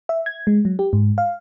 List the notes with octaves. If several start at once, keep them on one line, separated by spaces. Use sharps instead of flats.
E5
G#6
G#3
F#3
G4
G#2
F5